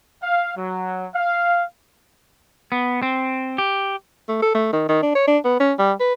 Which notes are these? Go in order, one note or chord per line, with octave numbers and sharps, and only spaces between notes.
F5
F#3
F5
B3
C4
G4
A3
A4
A3
D#3
D#3
D4
C#5
D4
B3
C#4
G3
B4